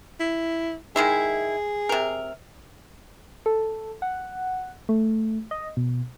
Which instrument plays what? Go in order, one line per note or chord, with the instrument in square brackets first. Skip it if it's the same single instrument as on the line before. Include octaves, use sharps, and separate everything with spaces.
[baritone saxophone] E4
[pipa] D#3 G#3 E4 [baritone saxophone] G#4
[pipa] C3 A#4
[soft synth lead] A4
F#5
A3
D#5
B2